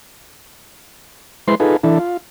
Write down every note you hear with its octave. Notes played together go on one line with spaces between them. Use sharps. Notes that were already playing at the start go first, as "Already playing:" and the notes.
G#3 E4 B4 C5 C6
D#4 F4 G#4 A4 B4
E3 D4 E4 A4
F4